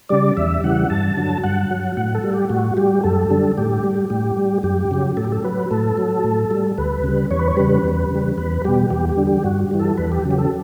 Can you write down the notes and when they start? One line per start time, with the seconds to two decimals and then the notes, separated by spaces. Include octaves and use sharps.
0.09 C#3 G3 D5
0.37 E2 E5
0.64 C#3 E3 G3 F#5
0.90 G2 A5
1.17 D3 F#3
1.44 G2 F#5
1.71 F#3
1.97 A2 F#5
2.15 A4
2.24 G3
2.33 G4
2.50 A2 F#4
2.77 G3 G4
3.04 F#2 A4
3.30 D3 G3
3.58 A2 G4
3.84 G3
4.10 A2 G4
4.37 G3
4.63 F#2 G4
4.91 C#3 F#3
5.17 A2 A4
5.25 G4
5.32 A4
5.44 F#3 B4
5.70 A2 A4
5.97 F#3
6.24 A2
6.51 G3
6.78 D2 B4
7.04 C#3 G3
7.31 E2 C#5
7.39 B4
7.48 C#5
7.57 C#3 G3 B4
7.84 E2
8.10 C#3 G3
8.38 E2 B4
8.65 B2 G3 G4
8.90 E2 G4
9.09 G4
9.17 D3 G3
9.27 G4
9.44 G2 F#4
9.71 E3 G3
9.79 A4
9.98 E2 B4
10.12 G4
10.25 C#3 F#3
10.31 G4
10.38 A4